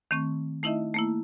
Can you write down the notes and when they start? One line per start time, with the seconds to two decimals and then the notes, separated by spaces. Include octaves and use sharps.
0.11 D#3 A3 C4 C#6
0.63 A3 D#4 E4 D#5 E5
0.94 A3 A#3 E4